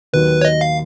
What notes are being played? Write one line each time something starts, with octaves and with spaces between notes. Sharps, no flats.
D#2 D#3 F#3 B4
C#5
D#5
F5